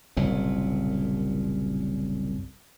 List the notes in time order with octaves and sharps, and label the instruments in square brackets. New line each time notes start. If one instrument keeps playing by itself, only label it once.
[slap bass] F#1 C2 A#2